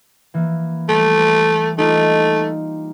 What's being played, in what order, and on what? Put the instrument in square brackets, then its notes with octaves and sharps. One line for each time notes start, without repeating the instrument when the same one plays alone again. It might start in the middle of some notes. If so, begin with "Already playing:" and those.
[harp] E3 A#3
[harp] G3 [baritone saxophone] A3
[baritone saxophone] A3 [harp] D#4 F4 G4